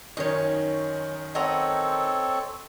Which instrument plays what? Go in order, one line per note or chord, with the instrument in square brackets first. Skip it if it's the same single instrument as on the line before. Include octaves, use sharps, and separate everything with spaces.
[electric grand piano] F#2 D#3 C#4 [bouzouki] D#4 C#5
[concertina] C4 A4 C#5 [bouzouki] D#5 F#5 A#5